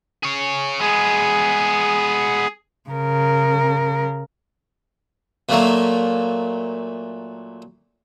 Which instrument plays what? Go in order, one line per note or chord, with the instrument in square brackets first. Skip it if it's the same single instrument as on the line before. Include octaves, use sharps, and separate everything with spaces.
[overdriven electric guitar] G#4 C#5
[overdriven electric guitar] G#3 B3 [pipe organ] G#4
[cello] C#3 A#4
[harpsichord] A#2 F#3 A3 A#3